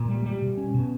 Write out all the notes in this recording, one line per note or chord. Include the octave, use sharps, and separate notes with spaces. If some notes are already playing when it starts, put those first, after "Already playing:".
Already playing: A#2
G3
G3
B2
C#4
B2